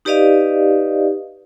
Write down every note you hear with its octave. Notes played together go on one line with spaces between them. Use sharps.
D#4 G4 B4 D5 D#5 F5